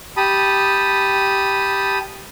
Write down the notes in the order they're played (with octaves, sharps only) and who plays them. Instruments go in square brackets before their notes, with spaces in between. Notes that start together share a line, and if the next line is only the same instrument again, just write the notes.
[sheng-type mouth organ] G4 A5 B5 D#6